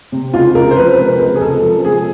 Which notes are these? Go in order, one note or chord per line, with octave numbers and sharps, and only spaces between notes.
C3
C#2 F4
C#2 A#4
C5
F3 B4
C3 B4
C#2 A#4
G#4
C#2 A4
F3
C3 G#4